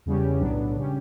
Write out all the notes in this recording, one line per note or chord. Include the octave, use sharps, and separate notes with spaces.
E2 C#3 G3 C#4 G4
B1 A2 F#3 B3 D4
C#3 G3 C#4 G4